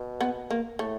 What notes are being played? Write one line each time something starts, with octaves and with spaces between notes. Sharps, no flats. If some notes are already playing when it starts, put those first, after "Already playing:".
Already playing: B2
B3
A#3
A2 A3